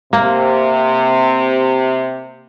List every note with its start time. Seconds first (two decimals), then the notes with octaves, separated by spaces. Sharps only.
0.13 C3 A#3